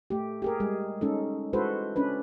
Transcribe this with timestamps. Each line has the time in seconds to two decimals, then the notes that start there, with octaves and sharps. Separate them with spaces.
0.10 A3 G4
0.42 G4 G#4 A#4
0.60 G3 G#3 G#4
1.01 G#3 C#4 D#4 A4
1.53 G#3 E4 F#4 A4 B4 C5
1.96 C#4 D4 B4